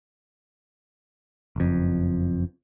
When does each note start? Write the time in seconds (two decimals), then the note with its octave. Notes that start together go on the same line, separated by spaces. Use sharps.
1.56 F#1 F2